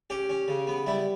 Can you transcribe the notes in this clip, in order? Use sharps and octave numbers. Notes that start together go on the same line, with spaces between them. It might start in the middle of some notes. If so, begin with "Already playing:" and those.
C#4 G4
C#4
C#3
B3
G3 E4